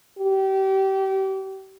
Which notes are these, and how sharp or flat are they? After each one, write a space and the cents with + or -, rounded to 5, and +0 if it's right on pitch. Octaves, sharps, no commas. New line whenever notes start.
G4 -30